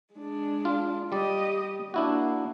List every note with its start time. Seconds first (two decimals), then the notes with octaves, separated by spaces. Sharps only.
0.14 G#3 D4
0.65 F4
1.12 G3 G4 D5 D#5
1.94 A#3 D4 E4 F#4